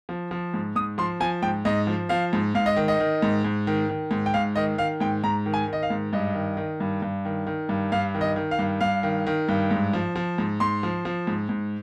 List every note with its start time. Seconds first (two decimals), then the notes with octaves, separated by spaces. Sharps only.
0.09 F3
0.31 F3
0.54 G#2
0.76 G#2 D#6
0.98 F3 C6
1.20 F3 G#5
1.42 G#2 G5
1.65 G#2 D#5
1.87 F3
2.09 F3 F5
2.33 G#2
2.55 G#2 F5
2.66 D#5
2.76 D#3
2.88 D#5
3.00 D#3
3.22 G#2
3.45 G#2
3.67 D#3
3.89 D#3
4.11 G#2
4.26 G5
4.34 G#2 F5
4.56 D#3 D#5
4.78 D#3 F5
5.00 G#2 G5
5.24 G#2 A#5
5.46 D#3
5.54 G#5
5.67 D#3
5.73 D#5
5.83 F5
5.90 G#2
6.13 G2 D#5
6.34 D#3
6.57 D#3
6.80 G2
7.02 G2
7.25 D#3
7.47 D#3
7.69 G2
7.92 G2 F5
8.14 D#3
8.21 D#5
8.36 D#3
8.51 F5
8.59 G2
8.81 G2 F5
9.03 D#3
9.27 D#3
9.49 G2
9.71 G#2
9.93 F3
10.16 F3
10.38 G#2
10.60 G#2 C6
10.83 F3
11.05 F3
11.27 G#2
11.49 G#2